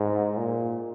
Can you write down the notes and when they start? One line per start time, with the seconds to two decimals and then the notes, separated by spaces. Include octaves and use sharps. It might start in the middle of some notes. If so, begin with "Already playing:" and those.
Already playing: G#2
0.38 A#2